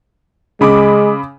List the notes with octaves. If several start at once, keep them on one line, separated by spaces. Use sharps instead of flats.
C#3 G#3 B5 D6